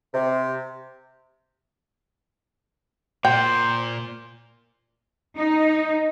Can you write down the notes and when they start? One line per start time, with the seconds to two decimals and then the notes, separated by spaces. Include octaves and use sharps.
0.14 C3
3.25 A#2 C5 G5
5.36 D#4